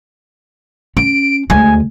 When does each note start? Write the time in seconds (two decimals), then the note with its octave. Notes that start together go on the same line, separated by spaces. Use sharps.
0.97 C#4 D7
1.50 D2 G#3 G#5